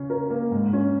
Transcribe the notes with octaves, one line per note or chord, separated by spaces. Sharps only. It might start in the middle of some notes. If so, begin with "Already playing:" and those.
Already playing: C#3 C#4
A#4
A#3
G#2
C#4